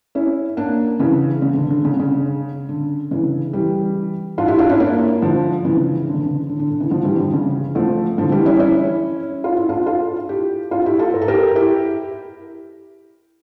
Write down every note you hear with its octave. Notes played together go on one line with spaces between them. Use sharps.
C#4 E4
A#3 D4
C#3 E3
C#3
D3
D3
C#3
C#3
D3
C#3 E3
E3 G3
D4 F4
E4 G4
D4 F4
C#4 E4
A#3 D4
D3 F3
C#3 E3
D3
C#3
D3
D3
D3
D3
C#3 E3
D3 F3
E3 G3
D3 F3
C#3
F3 A3
D3 F3
E3 G3
C#4 E4
C#4 E4
F4
E4
D4 F4
F4 A4
E4 G4
D4 F4
E4 G4
F4 A4
A#4
A4
G4 A#4
E4 G4